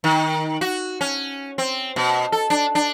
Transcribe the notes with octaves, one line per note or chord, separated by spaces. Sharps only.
D#3
F#4
C#4
C4
B2
A4
D4
D4